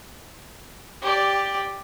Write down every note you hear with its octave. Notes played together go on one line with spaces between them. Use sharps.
G4 D5